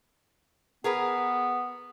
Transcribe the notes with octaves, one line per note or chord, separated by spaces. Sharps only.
B3 G#4 A#4 B4